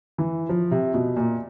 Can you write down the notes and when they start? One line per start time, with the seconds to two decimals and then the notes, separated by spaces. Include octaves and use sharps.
0.18 E3
0.49 F3
0.71 C3
0.94 B2
1.16 A#2